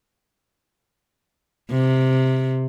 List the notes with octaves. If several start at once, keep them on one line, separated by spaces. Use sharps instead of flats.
C3